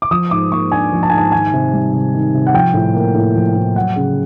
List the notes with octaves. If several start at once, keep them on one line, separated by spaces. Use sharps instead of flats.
D6
F3 D#6
G#2 D6
A#3 C#6
D4 G#5
F3
A5
G#2 G#5
A5
D#3 G#5
C3
G3
C3
D#3
C3
F#5
F3 G5
A2
A#3
A2
F3
A2
F#3 F#5
C#3